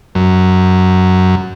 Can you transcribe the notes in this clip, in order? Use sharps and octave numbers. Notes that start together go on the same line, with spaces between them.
F#2